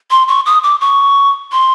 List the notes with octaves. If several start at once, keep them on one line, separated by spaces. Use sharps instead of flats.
C6
C#6
D#6
D6
C#6
C6